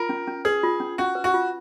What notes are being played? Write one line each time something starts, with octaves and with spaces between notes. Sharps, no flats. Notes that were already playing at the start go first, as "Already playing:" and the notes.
Already playing: F4 A#4
C#4
C#4
G#4 B4
F4
C#4
C#4 F#4
B4
F#4
F4